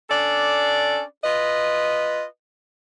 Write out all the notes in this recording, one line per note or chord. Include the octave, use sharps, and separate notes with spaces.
C#4 D4 A4 D5
F4 B4 D#5